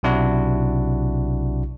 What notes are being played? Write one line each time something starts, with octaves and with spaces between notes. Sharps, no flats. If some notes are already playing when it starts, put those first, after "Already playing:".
B1 C3 D4 E4 F#4